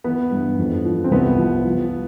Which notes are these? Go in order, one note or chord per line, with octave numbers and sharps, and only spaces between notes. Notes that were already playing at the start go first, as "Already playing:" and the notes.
E3 B3
G2
F2
F3
C4
C2 B3
F3
F3